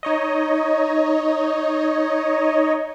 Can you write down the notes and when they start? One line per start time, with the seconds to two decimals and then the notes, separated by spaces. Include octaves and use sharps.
0.03 D#4 C#5 D#5